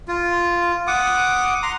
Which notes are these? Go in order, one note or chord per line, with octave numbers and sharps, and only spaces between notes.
F4
F#5 D6 D#6
A#5 C6